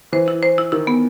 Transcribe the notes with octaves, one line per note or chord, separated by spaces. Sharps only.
E3 C5
E4
C5
E4
D#3 E4
B3